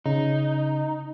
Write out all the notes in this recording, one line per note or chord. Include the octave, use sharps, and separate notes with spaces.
C#3 D#4